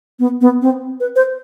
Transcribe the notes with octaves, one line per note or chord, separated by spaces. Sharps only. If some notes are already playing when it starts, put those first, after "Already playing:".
B3
B3
C4
B4
C5